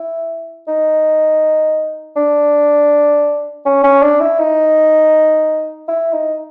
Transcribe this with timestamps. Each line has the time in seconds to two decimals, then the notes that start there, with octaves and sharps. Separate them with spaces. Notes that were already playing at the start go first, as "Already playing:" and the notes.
Already playing: E4
0.68 D#4
2.16 D4
3.65 C#4
3.84 C#4
4.02 D4
4.20 E4
4.39 D#4
5.88 E4
6.13 D#4